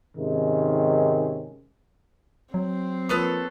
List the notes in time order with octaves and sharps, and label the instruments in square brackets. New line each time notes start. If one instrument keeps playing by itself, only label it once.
[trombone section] G#2 C3 D#3 G#3 C#4
[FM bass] F#3 [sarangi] C4
[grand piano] F3 A#3 D#6 [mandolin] A4 B4 C#5